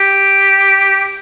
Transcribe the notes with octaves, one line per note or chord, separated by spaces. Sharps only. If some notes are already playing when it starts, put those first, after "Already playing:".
Already playing: G4